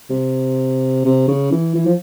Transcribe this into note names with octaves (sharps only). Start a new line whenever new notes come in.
C3
C3
C#3
E3
E3
F3